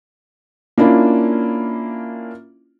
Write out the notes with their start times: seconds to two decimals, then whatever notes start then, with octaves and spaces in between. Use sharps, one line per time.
0.78 A#3 C#4 D4 E4 F4